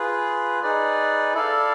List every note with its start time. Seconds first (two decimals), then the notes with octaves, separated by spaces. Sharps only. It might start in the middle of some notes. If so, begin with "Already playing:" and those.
Already playing: F4 G#4 B4
0.63 D#4 G#4 B4 D5
1.34 E4 A4 D5 F5